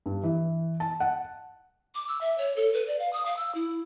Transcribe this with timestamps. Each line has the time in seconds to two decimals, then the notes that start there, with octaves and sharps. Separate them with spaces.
0.06 G2
0.23 E3
0.80 A5
1.00 F#5
1.95 D6
2.08 E6
2.21 E5
2.38 C#5
2.56 A4
2.74 B4
2.87 D5
2.99 F5
3.13 D#6
3.26 F5
3.37 E6
3.55 E4